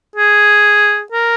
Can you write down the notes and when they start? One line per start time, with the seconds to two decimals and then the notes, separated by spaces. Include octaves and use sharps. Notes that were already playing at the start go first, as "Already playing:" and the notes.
0.16 G#4
1.12 A#4